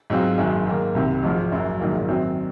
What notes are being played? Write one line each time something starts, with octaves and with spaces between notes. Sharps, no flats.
G#2 F#3 C4 F4
F#1 F#2 D#3 G#3
G#2 D#3 A#3
C2 C3 D#3
G#1 G#2 F3
F#1 F#2 C#3 F#3
A#1 G#2 D#3 F#3 A#3
F#2 D#3 F#3 C4